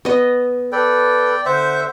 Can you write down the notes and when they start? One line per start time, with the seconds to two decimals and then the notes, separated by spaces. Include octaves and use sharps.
0.05 B3 D#5
0.72 A4 B4 D5 G5
1.46 D3 C5 E5 F#5 G6